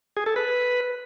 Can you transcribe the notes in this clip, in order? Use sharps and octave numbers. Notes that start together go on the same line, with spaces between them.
G#4
A4
B4